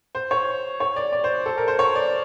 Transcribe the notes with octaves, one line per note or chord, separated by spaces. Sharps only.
C5
C#5
C#5
D5
D5
C5
A4
A#4
C5
C#5
D5